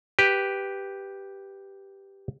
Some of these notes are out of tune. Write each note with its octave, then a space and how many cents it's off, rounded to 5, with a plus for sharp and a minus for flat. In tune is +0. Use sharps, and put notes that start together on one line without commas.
G4 +0 B4 +0